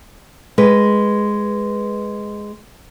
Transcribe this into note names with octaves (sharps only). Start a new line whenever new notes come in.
G#3 B4